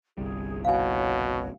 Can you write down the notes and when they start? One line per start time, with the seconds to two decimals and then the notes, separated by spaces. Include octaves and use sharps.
0.18 G1 C2 G3 G#4
0.65 B2 F#4 C#5 F5 G#5